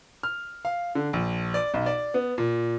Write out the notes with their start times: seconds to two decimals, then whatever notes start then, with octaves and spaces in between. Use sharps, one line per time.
0.23 F6
0.65 F5
0.95 D3
1.13 A#1
1.54 D5
1.74 B1
1.86 D5
2.14 B3
2.38 A#2